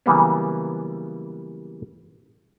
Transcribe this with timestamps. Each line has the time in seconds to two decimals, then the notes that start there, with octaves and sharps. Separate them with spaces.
0.06 C#3 E3 F#3 G3 A#3 B3